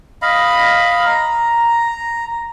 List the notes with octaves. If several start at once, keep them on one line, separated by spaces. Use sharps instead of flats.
D#5 F5 B5
A#5